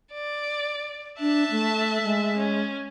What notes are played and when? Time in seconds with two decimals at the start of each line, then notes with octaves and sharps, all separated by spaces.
0.12 D5
1.20 D4 E5 A5 F#6
1.51 A3
2.03 G#3
2.37 C#4